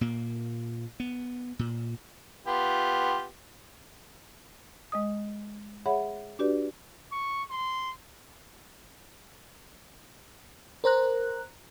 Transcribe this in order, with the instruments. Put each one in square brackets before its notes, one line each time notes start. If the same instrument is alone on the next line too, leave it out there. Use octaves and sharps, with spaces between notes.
[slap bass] A#2 A#3
B3
A#2
[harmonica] B3 F4 G4
[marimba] G#3 D#5 D#6
G#4 C#5 E5 F#5 B5
D4 F#4 G4 B4 D5
[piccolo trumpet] C#6
C6
[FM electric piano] A#4 C5 A#5 F#6